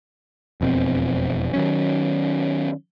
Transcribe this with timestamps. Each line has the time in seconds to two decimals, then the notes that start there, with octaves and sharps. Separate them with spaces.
0.61 E1 F2 B2 C4
1.53 D#3 F#3 C#4